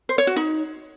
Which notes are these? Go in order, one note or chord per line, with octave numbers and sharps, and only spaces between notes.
C5
C#5
F#4
D#4